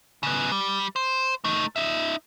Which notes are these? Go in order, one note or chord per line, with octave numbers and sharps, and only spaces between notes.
C#3 B3
G3
C5
A3 D#4
D#4 E5